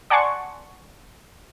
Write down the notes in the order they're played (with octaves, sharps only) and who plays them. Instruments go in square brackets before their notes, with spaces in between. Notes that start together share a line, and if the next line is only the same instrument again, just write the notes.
[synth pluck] D5 F#5 G#5 A5 C6 C#6